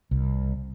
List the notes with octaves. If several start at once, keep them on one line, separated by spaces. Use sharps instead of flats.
C2